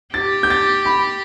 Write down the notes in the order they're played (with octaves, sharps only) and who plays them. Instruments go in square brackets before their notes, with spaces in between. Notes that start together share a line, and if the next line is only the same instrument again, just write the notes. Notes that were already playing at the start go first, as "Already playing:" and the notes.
[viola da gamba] G4 [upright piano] A6
[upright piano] G6
A6
B5